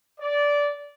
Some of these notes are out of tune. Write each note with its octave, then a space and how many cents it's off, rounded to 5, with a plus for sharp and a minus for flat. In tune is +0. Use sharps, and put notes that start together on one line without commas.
D5 -15